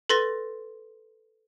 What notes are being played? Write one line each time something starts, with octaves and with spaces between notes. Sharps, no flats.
A4 B4 C6 A6 A#6